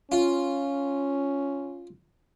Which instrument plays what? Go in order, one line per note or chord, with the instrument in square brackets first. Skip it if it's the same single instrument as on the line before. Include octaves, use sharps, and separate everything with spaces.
[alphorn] C#4 [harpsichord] F4